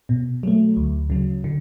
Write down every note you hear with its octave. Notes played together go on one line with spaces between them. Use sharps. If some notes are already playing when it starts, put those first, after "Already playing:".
B2
F#3 A3
D2
C#3 F#3
D3